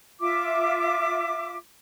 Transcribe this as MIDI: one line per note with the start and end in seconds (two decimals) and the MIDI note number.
0.20 1.55 65
0.20 1.55 76
0.20 1.55 86